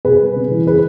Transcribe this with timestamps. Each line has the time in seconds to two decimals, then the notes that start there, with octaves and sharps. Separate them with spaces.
0.05 B2 G#4 B4
0.21 G3
0.36 C#3
0.51 E3
0.67 C#3 G#4 B4